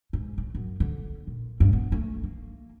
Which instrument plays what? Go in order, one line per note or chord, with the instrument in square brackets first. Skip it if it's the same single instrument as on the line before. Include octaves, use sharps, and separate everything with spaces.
[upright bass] G#2
A2
F#2
D3
A#2
G2
B3
A3
A#3